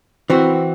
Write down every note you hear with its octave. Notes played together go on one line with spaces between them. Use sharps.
E3 C4 F#4